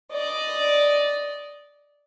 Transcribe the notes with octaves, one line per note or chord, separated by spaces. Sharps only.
D5 D#5